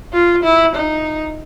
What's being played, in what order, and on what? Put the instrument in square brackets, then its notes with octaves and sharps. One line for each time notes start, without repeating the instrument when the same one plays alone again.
[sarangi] F4
E4
D#4